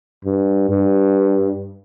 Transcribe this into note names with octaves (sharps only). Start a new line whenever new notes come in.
G2
G2